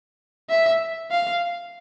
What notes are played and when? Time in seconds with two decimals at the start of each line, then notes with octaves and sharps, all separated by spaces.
0.50 E5
1.11 F5